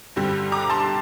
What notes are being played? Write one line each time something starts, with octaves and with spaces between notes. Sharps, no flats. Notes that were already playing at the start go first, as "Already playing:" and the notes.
G2 D3 G3 C4
A#5 D6
A5 C6